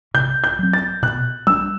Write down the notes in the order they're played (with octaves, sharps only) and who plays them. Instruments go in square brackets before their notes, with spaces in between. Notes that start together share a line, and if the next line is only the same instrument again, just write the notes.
[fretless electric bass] C3 [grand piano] G6
[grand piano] G6
[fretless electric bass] F#3 C4
[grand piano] A6
[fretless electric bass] B2 [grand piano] F#6
[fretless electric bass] G3 D4 [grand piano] E6